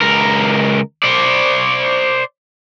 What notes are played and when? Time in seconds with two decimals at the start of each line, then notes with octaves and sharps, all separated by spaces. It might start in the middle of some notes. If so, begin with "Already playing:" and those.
0.01 C#2 A#4
1.04 C5 D5